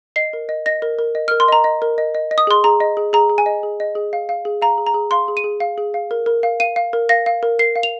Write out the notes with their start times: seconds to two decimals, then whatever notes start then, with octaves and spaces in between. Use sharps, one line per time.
0.16 D#5 C7
0.33 A#4
0.49 D#5
0.66 D#5 A#6
0.82 A#4
0.99 A#4
1.15 D#5
1.28 A#4 F6
1.40 C6
1.48 D#5 A#5
1.64 D#5
1.82 A#4
1.98 D#5
2.15 D#5
2.31 D#5
2.38 D#6
2.47 G#4 C6
2.64 G#4 A#5
2.80 D#5
2.97 G#4
3.13 G#4 A#5
3.30 G#4
3.38 G#5
3.46 D#5
3.63 G#4
3.80 D#5
3.95 G#4
4.13 F5
4.29 F5
4.45 G#4
4.62 F5 A#5
4.78 G#4
4.87 A#5
4.94 G#4
5.11 F5 C6
5.28 G#4
5.37 D#7
5.44 G#4
5.60 F5
5.78 G#4
5.94 F5
6.11 A#4
6.26 A#4
6.43 F5
6.60 F5 D#7
6.76 F5
6.93 A#4
7.09 F5 A#6
7.26 F5
7.43 A#4
7.59 A#4 C7
7.76 F5
7.83 F7